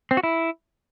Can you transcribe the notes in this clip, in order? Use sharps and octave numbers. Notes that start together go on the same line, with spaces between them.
C4
F#4
E4